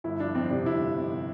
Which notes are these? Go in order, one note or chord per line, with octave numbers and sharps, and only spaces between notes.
G1 E4
F3 D4
F2 C4
C3 D4
G1 E4
F3
F2
C3